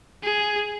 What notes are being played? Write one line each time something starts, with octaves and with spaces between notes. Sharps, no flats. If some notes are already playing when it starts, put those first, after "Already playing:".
G#4